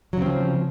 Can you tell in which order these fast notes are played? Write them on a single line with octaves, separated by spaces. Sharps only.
F#3 C#3 C4 F3